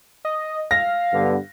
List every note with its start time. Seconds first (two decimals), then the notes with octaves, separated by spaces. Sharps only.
0.25 D#5
0.71 F5 A#6
1.13 G2 D3 B3